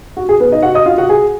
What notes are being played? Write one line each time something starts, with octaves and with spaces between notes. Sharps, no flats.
F#4
G#4
B3 B4
D#4 D#5
F#4 F#5
D#5 D#6
F4 F5
F#4 F#5
G#4 G#5